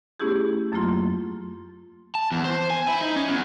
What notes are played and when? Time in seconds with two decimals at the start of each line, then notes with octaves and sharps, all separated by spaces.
0.20 A3 B3 C#4 E4 G4 G#4
0.72 F#2 F#3 A3 A#3 F4 C6
2.15 A5
2.32 E2
2.45 C5
2.70 G#5
2.88 E4
3.02 D#4
3.16 C#4
3.28 E2